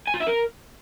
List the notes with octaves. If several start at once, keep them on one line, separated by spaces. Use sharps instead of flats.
G#5
F4
E5
A#4